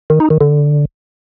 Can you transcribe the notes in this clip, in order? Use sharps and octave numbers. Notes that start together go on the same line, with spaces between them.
D#3
D#4
D#3
D3